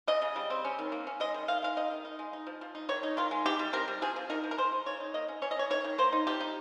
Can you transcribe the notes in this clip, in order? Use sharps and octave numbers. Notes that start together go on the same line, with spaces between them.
C#3 D#5
C#3
G3
C4
C#4
D#3
A#3
C#4
G#3 D#5
D#3
D#3 F5
G#3 F5
D#4 D#5
D#3
D#4
G#3
D#4
F3
F3
D#4
D#3 C#5
D#4
D#3 F4
G#3
D#4 G4
G3
C4 A#4
G3
F3 G#4
F3
D#4 A#4
F3
A#4
G#3 C5
D#4
C#3 C#5
D#4
A#3 D#5
C#4
C#4 C#5
D#5
C#4 C#5
D#3 C#5
D#3
A#3 C5
D#4
F3 G4
D#4